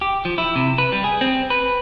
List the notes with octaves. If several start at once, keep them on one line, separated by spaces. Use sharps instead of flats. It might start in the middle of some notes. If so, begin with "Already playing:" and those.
G4
F3
E4
C3
B4
G3
G#4
C4
B4